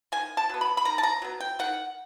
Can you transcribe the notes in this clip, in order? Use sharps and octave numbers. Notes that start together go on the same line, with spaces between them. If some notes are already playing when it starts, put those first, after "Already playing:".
D#3 G#5
A5
F#3 B3
B5
B5
D#3 A#5
A5
A#5
F#3 B3
G5
D#3 F#5